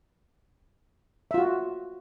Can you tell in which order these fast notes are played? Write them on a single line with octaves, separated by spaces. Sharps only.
E5 F4 F#4